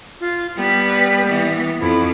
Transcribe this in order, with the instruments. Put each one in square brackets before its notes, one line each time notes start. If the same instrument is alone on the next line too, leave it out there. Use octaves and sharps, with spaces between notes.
[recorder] F4
[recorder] G3 [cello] B3 B4
[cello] E3 B3
[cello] F2 [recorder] E4